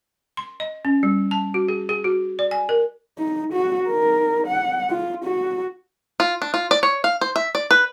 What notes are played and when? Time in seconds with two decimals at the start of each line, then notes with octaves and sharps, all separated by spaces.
0.37 C6
0.60 D#5
0.85 C#4
1.03 G3
1.31 A5
1.54 F#4
1.68 G#4
1.89 G#4
2.04 F#4
2.39 D5
2.51 G#5
2.69 A#4
3.19 D#4
3.53 F#4
3.88 D#4 A#4
4.47 F#5
4.90 F4
5.24 F#4
6.20 F4
6.42 D4
6.54 F4
6.71 D5
6.83 C#5
7.04 F5
7.21 C5
7.36 E5
7.55 D5
7.71 B4